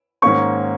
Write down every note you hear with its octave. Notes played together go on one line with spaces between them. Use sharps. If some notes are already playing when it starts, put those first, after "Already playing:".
G#2 D#3 A#3 C#4 C#6